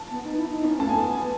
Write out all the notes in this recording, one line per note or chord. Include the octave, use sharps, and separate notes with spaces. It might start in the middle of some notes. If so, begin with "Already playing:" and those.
Already playing: A5
B3
D#4
E4
D#4
B3
C#4
A3 A5
B3 G#5